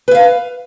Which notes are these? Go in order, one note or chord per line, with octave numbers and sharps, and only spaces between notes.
B4 E5 F5